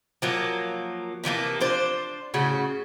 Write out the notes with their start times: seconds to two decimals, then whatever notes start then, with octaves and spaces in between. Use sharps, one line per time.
0.22 F3 F#3 A#3
1.24 C3 E3 F3 A#3
1.61 D4 F4 C5
2.34 A2 C#3 F#4